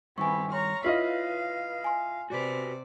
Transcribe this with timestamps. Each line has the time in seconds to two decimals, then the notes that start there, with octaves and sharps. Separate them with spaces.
0.18 G2 D#3 B3 C4 E4 G#5 C#6
0.52 C#5 A#5 C6 C#6 F6
0.84 E4 F4 B4 D#5 F5
1.84 G#5 C6
2.30 C3 F#4 G4 B4 C5 D5